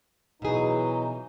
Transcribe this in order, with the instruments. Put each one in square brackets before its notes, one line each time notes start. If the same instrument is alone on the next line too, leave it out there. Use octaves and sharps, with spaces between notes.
[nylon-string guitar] B2 G#4 [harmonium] E3 F#3 D#4